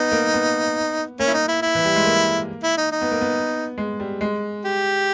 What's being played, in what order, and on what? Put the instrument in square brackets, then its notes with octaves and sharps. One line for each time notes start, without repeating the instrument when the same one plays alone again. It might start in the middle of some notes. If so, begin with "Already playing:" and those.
Already playing: [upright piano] B3 [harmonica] D#4
[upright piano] A#3
B3
[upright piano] A#3 [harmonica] C#4
[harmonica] E4
D#4
E4
E4
[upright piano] E3
G3
G#3
A#3
[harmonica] E4
D#4
D#4
[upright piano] B3
A#3
B3
G#3
G3
G#3
[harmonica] G4